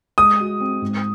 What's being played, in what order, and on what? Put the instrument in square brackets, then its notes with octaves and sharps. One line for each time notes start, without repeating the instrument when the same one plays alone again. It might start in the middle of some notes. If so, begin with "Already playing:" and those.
[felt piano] G#3 [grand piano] D#6
[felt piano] F#4
C4
G#2